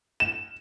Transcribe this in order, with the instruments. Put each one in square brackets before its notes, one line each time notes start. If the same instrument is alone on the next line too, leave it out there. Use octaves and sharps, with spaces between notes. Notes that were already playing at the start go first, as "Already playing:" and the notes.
[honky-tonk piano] E7